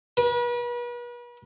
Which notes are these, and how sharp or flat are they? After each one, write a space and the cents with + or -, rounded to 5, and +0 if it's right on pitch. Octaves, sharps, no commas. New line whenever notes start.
B4 -40